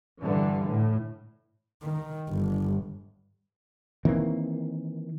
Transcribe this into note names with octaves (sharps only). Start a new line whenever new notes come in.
G2 D3 E3
A2
D#3
G1
D#3 E3 A#3 C4